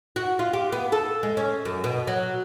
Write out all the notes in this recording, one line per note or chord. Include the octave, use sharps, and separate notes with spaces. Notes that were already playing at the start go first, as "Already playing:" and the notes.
F#4
F4
G4
B3
A4
G#3
C#4
F#2
B2
F#3